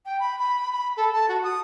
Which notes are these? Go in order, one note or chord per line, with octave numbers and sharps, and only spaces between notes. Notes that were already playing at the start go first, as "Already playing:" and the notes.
G5
B5
B5
B5
A4
A5
F#4
D#6